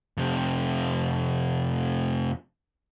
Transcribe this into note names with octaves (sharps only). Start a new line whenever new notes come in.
F2 C3